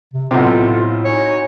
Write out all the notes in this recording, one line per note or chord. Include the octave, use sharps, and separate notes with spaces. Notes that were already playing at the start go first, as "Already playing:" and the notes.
C3
B1 A2 C3 F4 A4
D#4 F#4 C#5 G#5